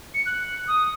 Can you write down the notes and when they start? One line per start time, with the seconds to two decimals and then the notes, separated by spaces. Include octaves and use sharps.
0.14 C#7
0.26 F#6
0.67 D#6